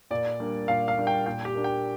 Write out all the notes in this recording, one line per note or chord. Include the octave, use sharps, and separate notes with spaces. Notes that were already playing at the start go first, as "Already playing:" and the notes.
A#2 D5
G3 A#3 D4
A#2 F5
F5
G3 A#3 D4
G5
A#2 G5
G4
A#3 D4
G5